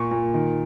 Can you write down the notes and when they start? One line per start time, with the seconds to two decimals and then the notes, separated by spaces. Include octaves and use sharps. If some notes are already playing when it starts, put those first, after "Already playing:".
Already playing: A#2 A#3 C#6
0.11 A#2
0.34 D#3